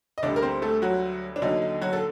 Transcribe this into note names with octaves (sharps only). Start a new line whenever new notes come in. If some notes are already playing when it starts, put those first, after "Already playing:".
D#5
D2 D3 G3 D4 D5
A#4
C4 C5
A3 A4
F#3 F#4
D4
D#2 D3 F#3 D#4
D#4
F#3 F#4
A4